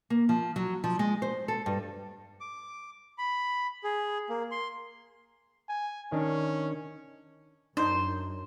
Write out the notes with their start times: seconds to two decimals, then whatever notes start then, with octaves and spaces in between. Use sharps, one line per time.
0.10 A#3
0.29 F3
0.56 F#3
0.84 F3
0.99 G#3
1.22 C5
1.48 A4
1.66 G2
2.40 D6
3.18 B5
3.84 G#4
4.30 A#3
4.51 C6
5.69 G#5
6.12 D#3 C#4 D4
7.77 F#2 D4 D#4 C5